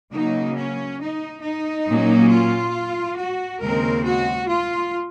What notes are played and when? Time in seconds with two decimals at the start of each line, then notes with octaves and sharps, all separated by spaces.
0.13 C#3 F#3 A#3 D#4
0.57 C#4
1.00 D#4
1.43 D#4
1.87 A#2 F#3 A#3 C#4
2.31 F4
3.18 F#4
3.60 D#2 C#3 G#3 C4 A#4
4.04 F#4
4.48 F4